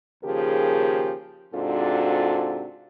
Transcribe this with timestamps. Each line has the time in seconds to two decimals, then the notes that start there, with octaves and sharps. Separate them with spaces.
0.24 D#2 C#3 F3 G4 G#4 A#4
1.54 G#2 C3 D4 F4 F#4 A4